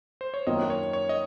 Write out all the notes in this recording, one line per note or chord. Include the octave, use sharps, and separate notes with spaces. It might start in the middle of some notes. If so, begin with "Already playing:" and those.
C5
C#5
F#2 D#3 A#3 F4 D#5
C#5
C#5
D#5